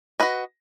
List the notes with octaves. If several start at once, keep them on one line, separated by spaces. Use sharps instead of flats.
F#4 B4 D#5